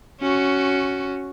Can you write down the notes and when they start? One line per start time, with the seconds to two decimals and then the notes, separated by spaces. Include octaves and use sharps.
0.21 C#4 F#4